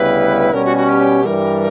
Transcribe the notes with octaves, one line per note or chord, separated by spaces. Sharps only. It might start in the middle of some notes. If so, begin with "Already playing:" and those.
Already playing: D2 C#3 G3 B3 E4 B4
B2 G3 C#4 A#4
F#4
F#4
G4
G2 E3 G3 A#4